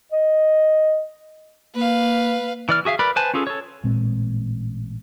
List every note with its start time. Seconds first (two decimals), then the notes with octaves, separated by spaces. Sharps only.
0.12 D#5
1.75 A#3 B4 F5
2.69 E3 D5 F6
2.85 F#4 G#4 E5 F5
2.99 A#4 B4 D5 B5
3.16 B4 C5 G#5 A5
3.34 C#4 F4 G#4 A4
3.47 A4 C#5
3.84 A1 A#2 G#3 C4